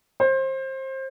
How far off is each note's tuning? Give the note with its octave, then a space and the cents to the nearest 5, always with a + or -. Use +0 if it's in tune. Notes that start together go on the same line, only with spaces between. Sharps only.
C5 +25